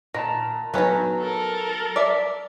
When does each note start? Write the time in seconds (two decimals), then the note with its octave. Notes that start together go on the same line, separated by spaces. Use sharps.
0.14 A#2 D#3 A5 A#5 A#6
0.74 F#3 B3 C#4 D#4 B4
1.20 A4 A#4
1.96 D5 E5